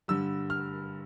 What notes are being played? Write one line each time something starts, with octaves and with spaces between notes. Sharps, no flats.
G2 D3 G3 E6
F6